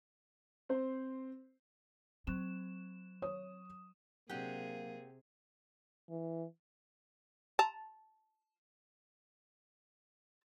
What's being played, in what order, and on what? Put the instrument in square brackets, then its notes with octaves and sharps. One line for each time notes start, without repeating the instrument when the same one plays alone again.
[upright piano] C4 C5
[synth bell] F#3 E7 [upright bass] C4
[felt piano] C#5 D#6
[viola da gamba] C3 G#4 [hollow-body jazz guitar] F#3 C4 D4 [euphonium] A#3 [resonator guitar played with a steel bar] G4 F#5
[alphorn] E3
[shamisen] A5 A#5